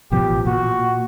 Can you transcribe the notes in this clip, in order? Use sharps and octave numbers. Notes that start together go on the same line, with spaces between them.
A1 B2 F3 G4
A#2 F#4